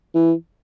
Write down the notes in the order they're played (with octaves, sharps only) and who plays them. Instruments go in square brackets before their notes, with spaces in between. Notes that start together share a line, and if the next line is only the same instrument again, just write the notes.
[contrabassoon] E3